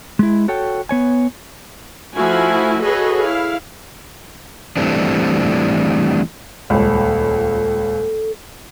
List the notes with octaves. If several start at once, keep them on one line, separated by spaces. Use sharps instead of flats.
G#3 E4
F#4 A4 C#5 G5
B3 C#5 G#5
F3 A3 E4 F#4 G#5
F#4 G#4 A4 B4 C#5 D#5
E4 F5
E3 G3 A3 C4 D4
D#1 C#2 A4